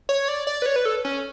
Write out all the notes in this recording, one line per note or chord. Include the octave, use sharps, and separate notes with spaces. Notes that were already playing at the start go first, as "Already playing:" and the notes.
C#5
D5
D5
B4
C#5
B4
A4
C#4